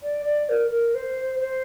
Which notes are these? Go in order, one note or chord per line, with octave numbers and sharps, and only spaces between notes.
D5
D5
A#4
A#4
C5
C5